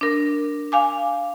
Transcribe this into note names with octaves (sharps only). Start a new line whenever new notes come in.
D4 A#4
F5 G#5 D6